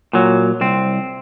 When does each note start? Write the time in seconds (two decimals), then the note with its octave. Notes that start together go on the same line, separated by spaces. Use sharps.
0.13 A#2 F#3
0.61 C2 C4